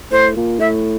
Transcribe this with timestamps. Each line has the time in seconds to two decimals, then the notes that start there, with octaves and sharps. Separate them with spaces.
0.11 A2 C5
0.36 A#2
0.60 A2 E5